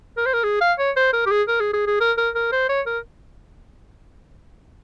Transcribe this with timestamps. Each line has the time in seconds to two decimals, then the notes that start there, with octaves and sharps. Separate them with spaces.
0.17 A#4
0.26 C5
0.33 A#4
0.44 G#4
0.61 F5
0.78 C#5
0.96 C5
1.13 A#4
1.26 G4
1.30 G#4
1.48 A#4
1.60 G#4
1.73 G#4
1.87 G#4
2.00 A#4
2.17 A#4
2.35 A#4
2.52 C5
2.69 C#5
2.86 A#4